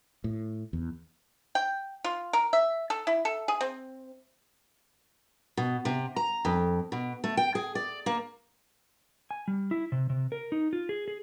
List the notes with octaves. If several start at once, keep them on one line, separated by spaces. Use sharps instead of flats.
A2
E2
G5
F4
A#4
E5
A4
E4
A4
G#4
C4
B2
C3
A#5
F2
B2
A3
G5
G#4
D5
A#3
G#5
G3
E4
C3
C3
A#4
D#4
F4
G#4
G#4